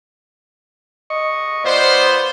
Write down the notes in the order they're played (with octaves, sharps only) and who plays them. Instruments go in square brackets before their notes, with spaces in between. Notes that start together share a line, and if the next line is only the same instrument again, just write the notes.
[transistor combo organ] D#5 C#6
[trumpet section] B3 F4 C5 [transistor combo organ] D5 C6